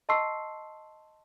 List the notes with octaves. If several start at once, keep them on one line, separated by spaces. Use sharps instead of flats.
D#5 A5 C6 C#6 E6 C7